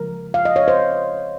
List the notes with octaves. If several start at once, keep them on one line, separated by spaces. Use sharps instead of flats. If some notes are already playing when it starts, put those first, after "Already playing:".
Already playing: C#3 F3 G#3 A#4
F5
D#5
C#5
C5